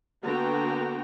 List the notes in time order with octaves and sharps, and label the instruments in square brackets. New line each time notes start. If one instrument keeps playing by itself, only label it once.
[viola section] D3 A#3 B3 F#4 G5 A#5